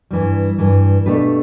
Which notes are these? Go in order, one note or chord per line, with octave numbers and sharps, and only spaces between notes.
G2 E3 G3
G2 E3 G3
B2 A3 D4 G4 B4